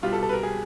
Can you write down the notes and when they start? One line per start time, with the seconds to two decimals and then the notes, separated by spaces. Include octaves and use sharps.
0.02 C2 B2 G3 F4
0.13 A4
0.23 A4
0.29 B4
0.33 A#4
0.43 G#4